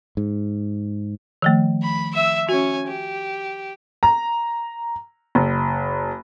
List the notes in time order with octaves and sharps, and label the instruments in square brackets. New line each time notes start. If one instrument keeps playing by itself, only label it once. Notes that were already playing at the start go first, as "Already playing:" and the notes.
[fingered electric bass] G#2
[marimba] D#3 F3 A3
[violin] B5
E5 E6
[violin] C#4 G#5 [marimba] F#4
[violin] G4
[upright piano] A#5
F#1